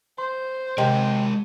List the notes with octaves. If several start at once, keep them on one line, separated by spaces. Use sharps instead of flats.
C5 C6
C3 G#3 A#4 C#5 D#5 G5